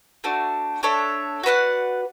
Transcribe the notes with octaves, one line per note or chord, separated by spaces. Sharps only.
A3 D4 F#4
D4 A4 C#5 E5
F#4 B4 D5 F#5